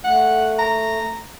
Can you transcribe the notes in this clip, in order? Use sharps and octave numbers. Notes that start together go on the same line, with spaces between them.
A3 F#5
A#5